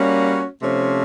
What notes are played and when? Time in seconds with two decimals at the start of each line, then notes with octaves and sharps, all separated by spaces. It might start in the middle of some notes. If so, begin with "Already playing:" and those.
Already playing: G3 A#3 C#4 F#4
0.62 C3 F3 A3 C#4